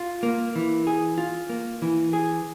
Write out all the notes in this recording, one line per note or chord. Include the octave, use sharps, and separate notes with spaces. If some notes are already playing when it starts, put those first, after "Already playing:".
Already playing: F4
A#3
E3
G#4
F4
A#3
E3
G#4